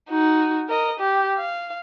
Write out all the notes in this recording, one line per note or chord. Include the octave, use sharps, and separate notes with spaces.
D#4 F#4
A#4 D#5
G4
F5